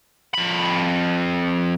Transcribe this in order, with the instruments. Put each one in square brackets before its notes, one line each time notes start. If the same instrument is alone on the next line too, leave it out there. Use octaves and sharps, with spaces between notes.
[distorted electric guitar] F2 B5